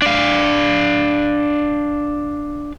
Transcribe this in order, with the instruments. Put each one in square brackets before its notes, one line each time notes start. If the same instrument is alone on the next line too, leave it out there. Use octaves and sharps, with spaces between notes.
[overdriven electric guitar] D4 F5